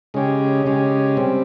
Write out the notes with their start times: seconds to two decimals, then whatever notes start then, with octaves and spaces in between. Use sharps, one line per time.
0.14 C#3 G#3 C#4 G4
0.66 C#3 G#3 C#4 G4
1.17 C3 G3 C4